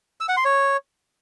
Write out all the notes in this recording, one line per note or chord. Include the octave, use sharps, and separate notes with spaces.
E6
F#5
C6
C#5